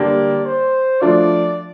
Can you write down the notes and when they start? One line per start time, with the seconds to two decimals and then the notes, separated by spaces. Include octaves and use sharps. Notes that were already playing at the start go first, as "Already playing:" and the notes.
Already playing: D3 G3 A#3 D4 G4 D5
0.45 C5
1.01 F3 A3 D4 F4 D5